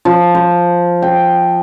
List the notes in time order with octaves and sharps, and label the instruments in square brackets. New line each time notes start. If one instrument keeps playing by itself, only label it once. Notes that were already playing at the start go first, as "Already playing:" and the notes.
[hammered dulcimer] F3
C5
G5